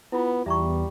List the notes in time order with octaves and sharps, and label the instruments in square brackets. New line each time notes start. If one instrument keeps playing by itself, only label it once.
[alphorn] B3 [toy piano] E4 F4
[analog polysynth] E2 [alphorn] G3 [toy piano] E5 A#5 C#6